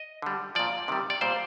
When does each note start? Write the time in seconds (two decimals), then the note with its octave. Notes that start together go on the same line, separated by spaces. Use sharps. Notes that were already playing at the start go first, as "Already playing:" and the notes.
Already playing: D#5
0.22 D3 G3
0.55 A#2 F3 D5
0.88 C3 D#3 G3
1.10 D5
1.21 A#2 G3 C5